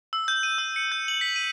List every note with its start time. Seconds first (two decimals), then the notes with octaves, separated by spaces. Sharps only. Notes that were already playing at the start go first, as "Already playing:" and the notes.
0.13 E6
0.28 G6
0.43 D#7
0.58 E6
0.76 C#7
0.92 G6
1.08 F#7
1.21 B6
1.36 D#7